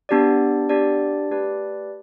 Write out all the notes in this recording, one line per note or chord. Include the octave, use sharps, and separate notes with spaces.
B3 D4 G4 D5
B3 D4 G4 D5
A3 G4 B4 D5 A5